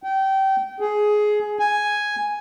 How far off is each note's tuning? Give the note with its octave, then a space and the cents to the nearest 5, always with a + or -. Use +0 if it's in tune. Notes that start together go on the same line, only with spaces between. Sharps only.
G5 -25
G#4 +15
G#5 +0